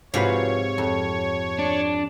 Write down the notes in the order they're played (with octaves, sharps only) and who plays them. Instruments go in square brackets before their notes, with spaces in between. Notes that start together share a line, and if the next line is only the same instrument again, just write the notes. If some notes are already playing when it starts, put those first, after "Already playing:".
[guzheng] G#2 C3 F5 [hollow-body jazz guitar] F3 F#4 B4 [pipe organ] C#5
[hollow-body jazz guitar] F2
[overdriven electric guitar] D4